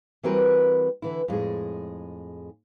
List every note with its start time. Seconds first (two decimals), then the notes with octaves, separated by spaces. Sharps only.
0.23 E3 G3 C4 F#4 A#4 B4
1.02 D3 E3 E4
1.28 F2 A2 G#3 G#4